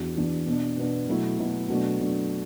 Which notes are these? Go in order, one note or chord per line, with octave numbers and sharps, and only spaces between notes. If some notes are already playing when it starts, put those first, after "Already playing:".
Already playing: E2 E3 D4 F#4
E2 E3 D4 F#4
B2 B3 D4
B2 B3 D4
B2 F#3 A3 E4
B2 F#3 A3 E4
B2 F#3 A3 D4
B2 F#3 A3 D4